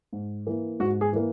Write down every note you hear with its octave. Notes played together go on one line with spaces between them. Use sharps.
G#2
E3 A#3
G#2 F#4
G#4
E3 A#3